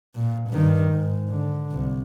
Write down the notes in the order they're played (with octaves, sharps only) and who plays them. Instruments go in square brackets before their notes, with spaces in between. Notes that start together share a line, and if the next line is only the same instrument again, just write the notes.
[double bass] A#2
G2 D#3
G#2
D3
C2